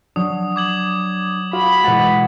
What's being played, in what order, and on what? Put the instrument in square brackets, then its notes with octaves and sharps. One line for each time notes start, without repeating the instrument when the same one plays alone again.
[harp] F#3 [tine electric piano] D4 [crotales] D#6
[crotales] D6 G#6 F#7
[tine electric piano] F4 F#4 F5 [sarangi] B5
[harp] B2 F#5 [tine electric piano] E3 G#3 [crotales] A6